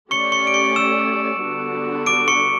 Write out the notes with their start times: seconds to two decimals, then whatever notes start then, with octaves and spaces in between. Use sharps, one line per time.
0.11 A3 C#4 G4 D5 C#6 C#7
0.32 C#6 C#7
0.47 D7
0.54 C#6 C#7
0.76 E6 E7
1.41 D3 G3 B3 D4 F#4
2.06 D6 D7
2.28 C#6 C#7